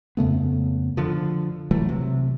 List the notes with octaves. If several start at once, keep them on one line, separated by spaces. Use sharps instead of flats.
F2 C#3 A3 B3
D3 F3
C2 E3 F#3 A3
C3